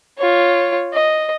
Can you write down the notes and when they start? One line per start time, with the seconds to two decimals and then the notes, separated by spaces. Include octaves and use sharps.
0.18 F4 C#5
0.93 D#5